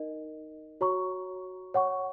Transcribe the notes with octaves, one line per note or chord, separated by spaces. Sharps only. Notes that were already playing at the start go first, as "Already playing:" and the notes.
Already playing: D#4 A#4 D#5
F#4 C#5 A#5 C#6
C#5 F#5 C#6